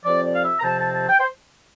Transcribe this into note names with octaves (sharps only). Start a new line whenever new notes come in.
F2 C3 F3 C4 D5
D5
F5
E5
A#5
F2 C3 F3 C4 A5
A5
A5
G5
C5